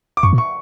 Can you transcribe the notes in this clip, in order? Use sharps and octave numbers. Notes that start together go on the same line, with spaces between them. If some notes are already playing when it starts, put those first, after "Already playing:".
D6
F#2 C#6
A#2
C#6